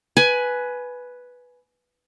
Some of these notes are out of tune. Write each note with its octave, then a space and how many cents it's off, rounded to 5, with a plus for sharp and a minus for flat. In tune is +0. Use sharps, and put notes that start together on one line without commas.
B4 +0 G#5 +15